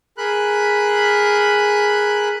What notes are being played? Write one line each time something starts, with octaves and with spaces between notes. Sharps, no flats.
G#4 A#4 B5 F#6